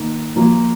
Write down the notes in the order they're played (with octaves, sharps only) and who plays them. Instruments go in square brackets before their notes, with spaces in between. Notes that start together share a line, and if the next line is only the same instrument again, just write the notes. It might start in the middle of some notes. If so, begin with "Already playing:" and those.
Already playing: [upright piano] D#3 A#3
F3 A#3 F4